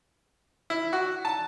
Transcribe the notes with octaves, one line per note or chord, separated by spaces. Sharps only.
E4
F#4
A5